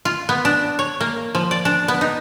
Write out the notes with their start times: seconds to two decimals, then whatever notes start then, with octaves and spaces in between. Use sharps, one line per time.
0.05 F4
0.29 B3
0.45 D4
0.79 C#5
1.01 A#3
1.35 F3
1.51 D5
1.65 D4
1.88 B3
2.01 D#4